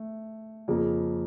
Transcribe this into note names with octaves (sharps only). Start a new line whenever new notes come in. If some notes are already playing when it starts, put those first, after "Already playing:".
Already playing: A3
F2 C#3 F3 A#3